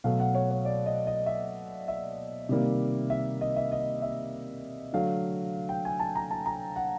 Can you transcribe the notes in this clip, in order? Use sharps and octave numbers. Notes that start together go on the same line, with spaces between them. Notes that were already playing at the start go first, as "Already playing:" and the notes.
B2 F#3 A3 F5
F#5
C#5
C#5
D5
D#5
D#5
E5
E5
C3 D#3 G3 A#3
E5
D#5
E5
D#5
E5
D3 F#3 A3 F5
G5
G#5
A5
A#5
A5
A#5
F#5